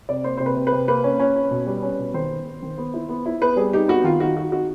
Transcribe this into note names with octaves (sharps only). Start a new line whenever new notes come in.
C3 D5
A#3 C5
C3 C5
B4
C3
B4
C3
A#3 B4
C#4
C#4
C#4
B2
G3
C#4
B2
D#3 C5
B3
B3
D#3
B3
E4
B3
E4
B3 B4
G3 G#4
D#4 G4
B3 F#4
D#3 F4
D#4 F#4
D#4 F#4
D#4 F#4